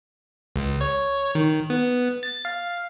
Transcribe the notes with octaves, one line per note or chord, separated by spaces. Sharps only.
C#2
C#5
D#3
B3
A6
F5